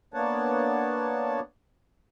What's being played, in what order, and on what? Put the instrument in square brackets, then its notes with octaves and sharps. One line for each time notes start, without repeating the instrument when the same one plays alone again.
[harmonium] A#3 B3 D4 C#5 F#5 A5